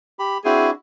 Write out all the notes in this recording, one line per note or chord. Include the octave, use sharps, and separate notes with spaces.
G4 B5
C4 D4 E4 F#4 G#4